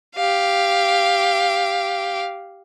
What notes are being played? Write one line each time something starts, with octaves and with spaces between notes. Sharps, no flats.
G4 F5